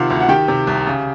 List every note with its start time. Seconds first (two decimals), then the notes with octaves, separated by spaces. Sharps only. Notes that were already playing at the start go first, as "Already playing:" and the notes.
Already playing: C3 D#3 F4 F5 F#5
0.10 D2
0.20 F#5
0.29 D#3 G4 G5
0.48 C3
0.67 C2
0.87 C#3